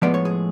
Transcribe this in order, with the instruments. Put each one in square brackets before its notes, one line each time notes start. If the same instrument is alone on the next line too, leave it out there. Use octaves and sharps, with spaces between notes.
[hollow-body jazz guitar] A2 F3 G#3 B3 D5
C#5
G#4